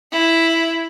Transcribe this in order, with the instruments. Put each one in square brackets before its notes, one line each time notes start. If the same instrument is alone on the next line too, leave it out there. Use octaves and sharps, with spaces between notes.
[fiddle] E4